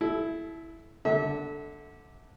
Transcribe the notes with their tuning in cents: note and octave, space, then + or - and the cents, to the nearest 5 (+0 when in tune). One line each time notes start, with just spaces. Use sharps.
E4 +0 A4 -40
D3 +0 E5 -35